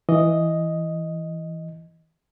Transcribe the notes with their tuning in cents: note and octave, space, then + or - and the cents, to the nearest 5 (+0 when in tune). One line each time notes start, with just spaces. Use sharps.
E3 +0 D#5 +0